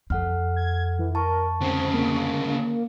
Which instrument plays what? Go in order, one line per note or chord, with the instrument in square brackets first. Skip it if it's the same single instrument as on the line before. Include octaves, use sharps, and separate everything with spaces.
[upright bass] F2 [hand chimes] A4 F#5 F6
[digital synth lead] G#6
E3
[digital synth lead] A#4 [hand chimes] A5 C#6
[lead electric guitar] D2 C#3 [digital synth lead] C4
[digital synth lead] A#3